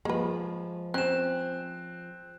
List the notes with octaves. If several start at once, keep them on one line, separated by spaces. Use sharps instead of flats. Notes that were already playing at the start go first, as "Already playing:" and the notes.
F3 G#3 A#3 B4
C4 C#4 F#6 E7